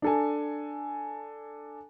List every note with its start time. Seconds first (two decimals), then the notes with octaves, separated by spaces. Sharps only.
0.02 D4 A4 G#5